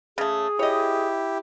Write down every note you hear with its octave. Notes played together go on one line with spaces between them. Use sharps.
C#3 A3 G#4
E4 G4 C#5 D#5